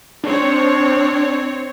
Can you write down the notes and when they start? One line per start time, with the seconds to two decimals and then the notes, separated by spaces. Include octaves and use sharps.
0.24 C4 D4 C#5